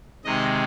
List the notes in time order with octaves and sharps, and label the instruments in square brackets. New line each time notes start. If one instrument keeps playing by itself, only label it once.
[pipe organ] C3 D#3 G#3 D#5